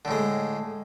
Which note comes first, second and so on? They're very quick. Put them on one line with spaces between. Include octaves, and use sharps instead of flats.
D3 A2 G#3